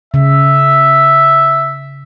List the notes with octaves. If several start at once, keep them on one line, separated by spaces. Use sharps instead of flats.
C#3 E5